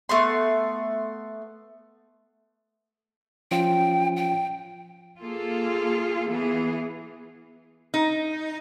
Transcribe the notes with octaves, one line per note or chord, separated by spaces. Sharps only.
A3 B3 C6
F3 C#4 F4 G5
G5
A#3 F4 G#4 A4
E3 B3 G#4
D#4